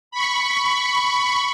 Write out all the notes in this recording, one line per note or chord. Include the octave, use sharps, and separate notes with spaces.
B5 C#6